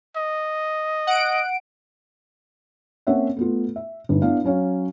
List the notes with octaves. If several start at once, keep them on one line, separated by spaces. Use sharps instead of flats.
D#5
F#5 D7
A#3 C4 C#4 C#5 E5 F#5
A3 B3 F4
E5
G1 G#2
B3 D4 E4 F5
F#3 C#4 C#5 F5